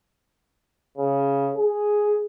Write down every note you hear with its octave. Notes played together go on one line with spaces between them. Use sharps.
C#3
G#4